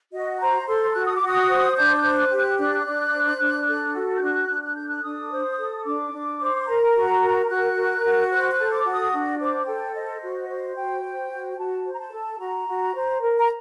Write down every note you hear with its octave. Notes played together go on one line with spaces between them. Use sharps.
F#4 D#5
C5 A#5
A4 C6
F#4 F#6
D#6
D6
F#4
D#6
C5
D4 G6
G6
C5
F#6
G4
F#6
D4 F#6
D4
C5
D4
A4
F#4
G6
D4 F#6
D4
F#6
A4 G6
F#6
D4 D#6
C5
A4
D4 D6
D4
C5
C6
A#4 A#5
F#4
A#4
F#4 F#6
A#4
F#4
C5 F#6
F#6
A4
D6
F#4
D#6
D4
C5 D6
A4 G5
C5 D#5
F#4
C5
F#4 G5
C5
F#4
F#4 A5
C5
A#5
A5
A4
F#4 A#5
F#4
C5
A#4
A#5